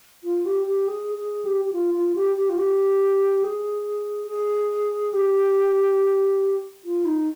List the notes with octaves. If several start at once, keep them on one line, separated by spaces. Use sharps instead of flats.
F4
G4
G4
G#4
G#4
G4
G4
F4
F4
G4
G4
F4
G4
G#4
G#4
G4
F4
D#4